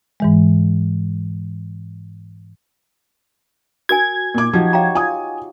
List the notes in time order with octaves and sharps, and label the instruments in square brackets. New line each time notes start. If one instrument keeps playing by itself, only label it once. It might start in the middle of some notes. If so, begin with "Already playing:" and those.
[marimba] G#2 E3 G#3
[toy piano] F#4 A#4 G#5 [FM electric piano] G#6
[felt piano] A#2 D6
[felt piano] F3 [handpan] D#4 F#4 G4
[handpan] F#4 C#5 [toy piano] F5 G5 A#5
[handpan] F4 [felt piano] G#5 D#6